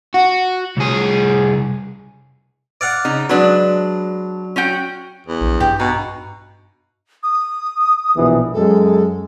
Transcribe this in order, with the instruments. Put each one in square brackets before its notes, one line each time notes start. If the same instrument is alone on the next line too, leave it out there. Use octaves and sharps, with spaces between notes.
[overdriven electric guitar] F#4
C2 G#4
[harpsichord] D5 F5 F#5
[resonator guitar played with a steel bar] C#3 D#4
[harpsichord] F#3 [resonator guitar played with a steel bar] G#3 D4 B4
[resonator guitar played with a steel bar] C#4 F#4 G5
[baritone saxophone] E2
[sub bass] A#1
[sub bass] G2 [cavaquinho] G4
[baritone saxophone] B2 [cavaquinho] D#4
[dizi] D#6
[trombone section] A#1 B2 E3
[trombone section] F#2 G#3 [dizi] A4